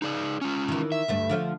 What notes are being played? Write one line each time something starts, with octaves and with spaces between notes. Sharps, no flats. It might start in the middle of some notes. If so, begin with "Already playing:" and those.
D#4 G#4 D5
C#4 F4
D#3 E3
E5
D2 G2 A3
D3 F3 A3